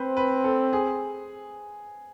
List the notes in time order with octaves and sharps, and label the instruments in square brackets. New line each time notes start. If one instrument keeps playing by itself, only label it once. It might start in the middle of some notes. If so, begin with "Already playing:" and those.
Already playing: [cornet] C4 [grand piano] B4 C5
[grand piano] B4
A4
G#4